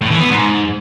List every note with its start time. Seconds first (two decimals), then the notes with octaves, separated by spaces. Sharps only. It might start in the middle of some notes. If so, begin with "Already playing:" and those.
0.01 A2
0.11 E3
0.20 B3
0.29 G#2